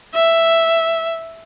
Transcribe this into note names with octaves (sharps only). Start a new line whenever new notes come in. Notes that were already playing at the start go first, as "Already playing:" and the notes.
E5